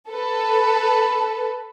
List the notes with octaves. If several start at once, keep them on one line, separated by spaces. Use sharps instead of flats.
A4 B4